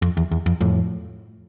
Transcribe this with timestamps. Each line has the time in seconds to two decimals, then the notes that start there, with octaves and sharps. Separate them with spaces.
0.02 F2
0.17 E2
0.31 E2
0.46 F2
0.61 F2 A2